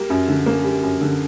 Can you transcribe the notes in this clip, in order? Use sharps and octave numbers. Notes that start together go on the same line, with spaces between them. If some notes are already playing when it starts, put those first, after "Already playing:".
Already playing: G3 A#3
F#2
D3
A#3
G3
F#2
D3